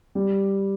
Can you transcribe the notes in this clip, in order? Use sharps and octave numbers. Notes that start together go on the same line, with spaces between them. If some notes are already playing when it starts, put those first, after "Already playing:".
G3